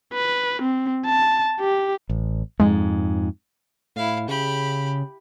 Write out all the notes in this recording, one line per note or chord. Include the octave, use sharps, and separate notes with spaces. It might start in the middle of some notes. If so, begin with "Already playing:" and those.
B4
C4
A5
G4
A1
F2 G#2 G#3
A2 E4 F5
C#3 G4 B5